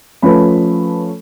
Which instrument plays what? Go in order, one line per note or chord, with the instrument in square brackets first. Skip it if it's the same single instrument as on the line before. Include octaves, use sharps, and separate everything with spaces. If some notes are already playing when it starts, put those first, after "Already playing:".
[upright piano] F3 A3 C#4 B4 B5